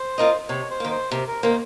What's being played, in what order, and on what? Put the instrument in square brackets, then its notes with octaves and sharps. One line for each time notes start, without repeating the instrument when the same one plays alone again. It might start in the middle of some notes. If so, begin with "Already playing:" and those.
Already playing: [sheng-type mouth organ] C5
[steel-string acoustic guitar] C4 F4 A#4 D#5
[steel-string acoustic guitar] C3 [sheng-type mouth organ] C#5
[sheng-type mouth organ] C5
[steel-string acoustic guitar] D#3 A#3
[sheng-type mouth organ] C5
[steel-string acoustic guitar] C3 [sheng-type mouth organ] A#4
[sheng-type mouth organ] A#4
[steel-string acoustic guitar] D#3 A#3 [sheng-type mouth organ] C5